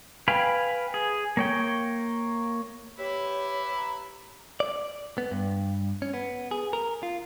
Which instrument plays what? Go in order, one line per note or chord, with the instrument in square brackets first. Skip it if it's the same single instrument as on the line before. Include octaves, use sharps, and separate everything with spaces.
[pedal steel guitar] B4 F5 G5 G#5 B5
G#4
A#3 C#5 G5
[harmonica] E4 B4 [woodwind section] G4 [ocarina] C#5
[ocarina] A#5
[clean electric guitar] D5
B3
G2
C#4
B3
G#4
A#4
F4